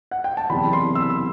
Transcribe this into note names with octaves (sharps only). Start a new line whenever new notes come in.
F#5
G5
A5
F#1 E2 C3 B5
C6
E6
E6